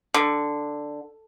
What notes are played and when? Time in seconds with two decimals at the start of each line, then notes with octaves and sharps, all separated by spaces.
0.14 D3